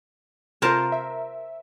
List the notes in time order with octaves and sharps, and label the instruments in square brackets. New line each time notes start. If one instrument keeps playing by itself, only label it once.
[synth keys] C3 F4 [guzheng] A#4 C5 A5
[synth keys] E5